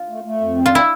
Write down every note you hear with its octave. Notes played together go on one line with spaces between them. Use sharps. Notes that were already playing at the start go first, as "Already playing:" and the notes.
Already playing: F4
A3
A3
F2
C4
F4
E4